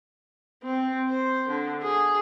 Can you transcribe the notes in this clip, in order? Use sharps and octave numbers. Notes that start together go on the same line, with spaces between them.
C4
C5
D3
G#4